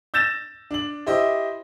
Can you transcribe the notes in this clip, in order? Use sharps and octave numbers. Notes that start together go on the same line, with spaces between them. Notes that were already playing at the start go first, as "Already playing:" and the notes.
E6 G6 A6 A#6 E7
D4 F#7
E4 G4 C5 D#5 E5